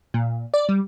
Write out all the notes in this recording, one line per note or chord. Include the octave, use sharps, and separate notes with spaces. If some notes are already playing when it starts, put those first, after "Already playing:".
A#2
D5
G3